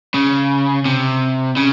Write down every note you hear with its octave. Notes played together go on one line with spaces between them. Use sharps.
C#3
C3
C#3